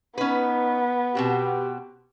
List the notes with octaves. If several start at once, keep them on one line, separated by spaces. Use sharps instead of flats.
B3 C#4 D#4 B4
B2 C4 F#4 G4